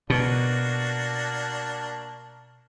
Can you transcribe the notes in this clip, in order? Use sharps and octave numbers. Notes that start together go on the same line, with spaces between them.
B2 A#3 D4 F#4